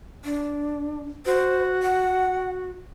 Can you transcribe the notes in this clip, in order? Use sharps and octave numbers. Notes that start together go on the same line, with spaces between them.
D4
F#4 C5
F#5